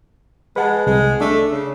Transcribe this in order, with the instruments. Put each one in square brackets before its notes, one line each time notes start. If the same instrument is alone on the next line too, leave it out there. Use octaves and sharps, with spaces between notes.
[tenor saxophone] G#3 [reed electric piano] B4 F#5 A5
[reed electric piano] C2 [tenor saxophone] G#3
[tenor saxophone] A3 [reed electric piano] D4
[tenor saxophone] C#3